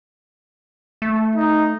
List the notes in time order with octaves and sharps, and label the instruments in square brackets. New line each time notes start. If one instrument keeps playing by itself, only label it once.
[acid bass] A3
[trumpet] D#4